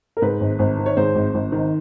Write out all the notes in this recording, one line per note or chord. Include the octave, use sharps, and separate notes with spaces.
A#4
G#2 B4
G#1
G#1
D#3
C#5
G#2 C5
G#1
G#1
D#3